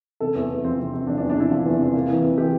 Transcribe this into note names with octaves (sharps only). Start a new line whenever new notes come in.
C3 A4
E2
E2
F3 C4
C3
C3
F3 D4
D4
E2
D4
C3 E4
F3
E2
C3
A#3
E3
F2
E3 G4